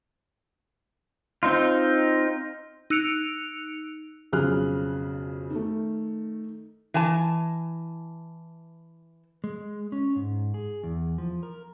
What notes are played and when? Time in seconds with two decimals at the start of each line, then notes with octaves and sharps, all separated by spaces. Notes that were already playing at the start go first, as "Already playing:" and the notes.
1.43 C4 D#4 F4
2.90 D#4 E6 F#6 C#7 D7 F7
4.33 B1 F2 C#3 G#4 F6 F#6
5.51 D#3 A3
6.94 E3 G#5 A5
9.44 G#3
9.92 C#4
10.16 G#2
10.54 G#4
10.83 E2
11.18 F3
11.43 A#4